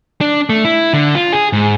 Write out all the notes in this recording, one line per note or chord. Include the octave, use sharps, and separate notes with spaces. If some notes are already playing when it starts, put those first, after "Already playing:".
D4
A3
E4
D3
F4
G#4
G#2